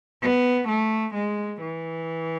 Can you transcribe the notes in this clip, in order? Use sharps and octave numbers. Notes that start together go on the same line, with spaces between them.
B3
A3
G#3
E3